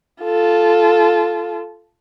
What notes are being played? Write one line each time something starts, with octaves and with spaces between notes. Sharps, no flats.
F4 A4